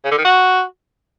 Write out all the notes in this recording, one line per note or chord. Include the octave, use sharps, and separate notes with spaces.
C#3
D3
D#3
F#4